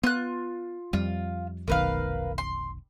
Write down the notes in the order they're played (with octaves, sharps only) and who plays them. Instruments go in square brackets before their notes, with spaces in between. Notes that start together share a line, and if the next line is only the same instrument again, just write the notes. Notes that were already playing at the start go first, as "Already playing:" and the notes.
[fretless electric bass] B3 [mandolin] F4 F#6
[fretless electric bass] F2 G3 [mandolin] F4
[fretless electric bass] F1 B1 D#3 [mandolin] A#4 B4 F5
[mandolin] C6